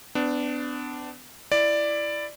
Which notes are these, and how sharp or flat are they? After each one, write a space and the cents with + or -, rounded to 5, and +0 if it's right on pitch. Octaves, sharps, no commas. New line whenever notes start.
B3 +35 D4 +0
E4 +15 D5 +5